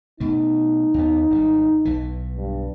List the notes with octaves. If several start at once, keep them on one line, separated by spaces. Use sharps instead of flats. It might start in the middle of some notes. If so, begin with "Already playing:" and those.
B2 A3 D#4
D#2 B3
G#1 D#3 G3
B1 E3
G2